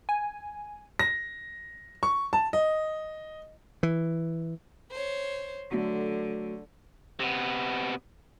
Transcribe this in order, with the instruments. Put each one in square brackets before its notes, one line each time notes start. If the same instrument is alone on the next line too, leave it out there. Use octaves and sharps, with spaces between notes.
[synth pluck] G#5
[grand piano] A#6
C#6
A5
D#5
[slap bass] E3
[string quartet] C5 C#5
[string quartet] D3 [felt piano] F#3 A3
[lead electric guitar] C3 B3